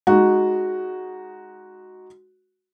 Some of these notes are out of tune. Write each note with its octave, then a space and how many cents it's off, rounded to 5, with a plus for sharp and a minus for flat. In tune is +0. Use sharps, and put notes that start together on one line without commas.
G#3 +0 D#4 +0 F#4 +0